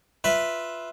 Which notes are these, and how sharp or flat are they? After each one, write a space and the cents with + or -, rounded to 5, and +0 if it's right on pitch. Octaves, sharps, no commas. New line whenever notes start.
F4 +0 B4 +0 E5 +0